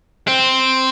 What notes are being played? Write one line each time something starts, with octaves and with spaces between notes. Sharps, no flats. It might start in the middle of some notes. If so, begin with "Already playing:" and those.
C4